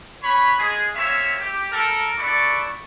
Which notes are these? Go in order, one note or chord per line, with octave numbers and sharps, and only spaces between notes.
B4 C#5 B5
G#3 G#4
A#3 C4 C#5 E5
G4
A4 A#4
B3 E4 A4 D5 C#6